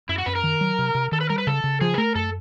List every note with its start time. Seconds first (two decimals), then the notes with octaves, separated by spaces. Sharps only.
0.09 F#2 E4
0.18 F#4
0.26 F#2 B4
0.35 A#4
0.43 D#3
0.61 F#3
0.79 C3
0.95 C3
1.12 D#3 A4
1.21 B4
1.30 G3 A#4
1.38 B4
1.47 C#3 A4
1.64 C#3
1.81 F3 G#4
1.94 B4
1.98 A3 A#4
2.15 F#2 A4